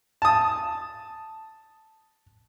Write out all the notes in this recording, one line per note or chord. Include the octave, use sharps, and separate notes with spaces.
A5 D#6